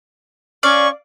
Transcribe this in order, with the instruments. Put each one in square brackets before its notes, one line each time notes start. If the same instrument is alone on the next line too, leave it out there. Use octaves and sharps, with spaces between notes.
[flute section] C#4 C#6 [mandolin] D5 F5